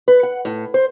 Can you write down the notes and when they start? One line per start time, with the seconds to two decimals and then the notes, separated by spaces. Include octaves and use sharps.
0.08 B4
0.23 F#5
0.45 A2
0.74 C5